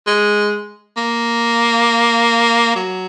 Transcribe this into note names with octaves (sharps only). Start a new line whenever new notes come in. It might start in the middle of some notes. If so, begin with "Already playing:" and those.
G#3
A#3
F#3